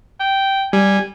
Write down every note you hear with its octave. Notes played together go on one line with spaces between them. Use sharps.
G5
G3 G#5